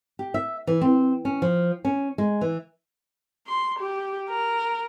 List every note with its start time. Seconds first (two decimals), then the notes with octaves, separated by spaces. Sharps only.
0.19 G4
0.34 E5
0.67 E3
0.81 C4
1.25 C#4
1.42 F3
1.85 C#4
2.18 G#3
2.41 E3
3.47 C6
3.79 G4
4.29 A#4